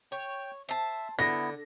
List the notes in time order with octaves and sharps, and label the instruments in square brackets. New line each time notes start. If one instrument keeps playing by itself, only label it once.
[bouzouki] C#5 [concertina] G5
[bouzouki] C5 A5 [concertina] E5
[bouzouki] D3 [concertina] B3 E4 [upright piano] A#6